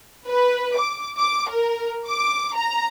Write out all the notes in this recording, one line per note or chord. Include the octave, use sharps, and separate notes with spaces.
B4
D6
D6
A#4
D6
A#5